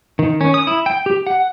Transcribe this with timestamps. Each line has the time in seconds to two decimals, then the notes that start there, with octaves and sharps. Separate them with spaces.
0.19 D#3
0.41 C#4
0.54 D#6
0.67 E4
0.86 G5
1.06 G4
1.27 F#5